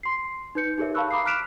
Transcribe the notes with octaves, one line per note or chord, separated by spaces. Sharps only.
C6 C7
D#4 B4 G6 C#7
D#4 G4 G#4 A#4 C#5 E5
F5 A5 B5 C#6 E6 F#6
A#5 B5 D6 D#6 C7
F6 F#6 B6 D7 E7 F7